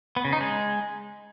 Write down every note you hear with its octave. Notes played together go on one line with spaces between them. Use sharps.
B3
C#3
D#4
G#3